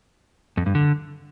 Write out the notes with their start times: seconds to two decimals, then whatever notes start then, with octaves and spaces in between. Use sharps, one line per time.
0.57 F2
0.66 G2
0.75 D3